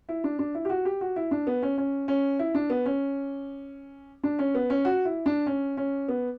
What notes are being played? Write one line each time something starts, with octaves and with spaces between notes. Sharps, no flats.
E4
D4
D4
E4
G4
F#4
G4
F#4
E4
D4
B3
C#4
C#4
C#4
E4
D4
B3
C#4
D4
C#4
B3
C#4
F#4
E4
D4
C#4
C#4
B3